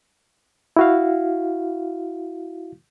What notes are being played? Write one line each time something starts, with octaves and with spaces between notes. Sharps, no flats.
E4 F#4 F5